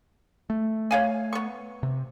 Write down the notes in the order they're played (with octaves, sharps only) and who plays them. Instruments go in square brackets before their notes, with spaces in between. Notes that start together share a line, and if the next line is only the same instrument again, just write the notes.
[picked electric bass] A3
[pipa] C#5 F5 G#5
B3 C#6
[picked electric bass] C3